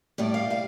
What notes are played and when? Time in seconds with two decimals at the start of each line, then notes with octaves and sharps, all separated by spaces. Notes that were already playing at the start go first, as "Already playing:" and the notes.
0.18 A2 G3 D5
0.34 F5
0.50 G3 F5